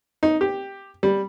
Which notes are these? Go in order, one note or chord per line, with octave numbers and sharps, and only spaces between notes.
D#4
G4
G3